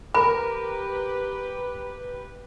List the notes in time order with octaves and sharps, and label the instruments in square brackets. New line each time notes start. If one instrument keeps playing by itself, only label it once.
[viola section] G4 B4 [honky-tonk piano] A#4 [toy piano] B5